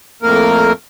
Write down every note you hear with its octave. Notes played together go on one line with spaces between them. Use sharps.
F2 A2 A#3 A#4